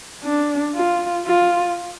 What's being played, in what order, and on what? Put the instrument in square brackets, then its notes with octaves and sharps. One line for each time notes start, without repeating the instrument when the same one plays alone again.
[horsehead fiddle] D4
F4
F4